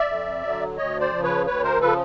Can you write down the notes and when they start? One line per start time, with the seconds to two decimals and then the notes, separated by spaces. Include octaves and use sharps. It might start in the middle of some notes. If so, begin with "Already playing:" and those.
Already playing: D5 E5
0.08 F2
0.43 D3 F#3
0.77 D2 C#5 D#5
1.00 C5 D5
1.12 C#3 F3
1.23 B4 C#5
1.46 D2 B4 C#5
1.63 A#4 C5
1.80 C#3 F3 A4 B4